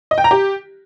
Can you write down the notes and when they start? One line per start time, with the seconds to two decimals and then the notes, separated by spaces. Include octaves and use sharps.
0.11 D#5
0.18 G5
0.24 A#5
0.31 G4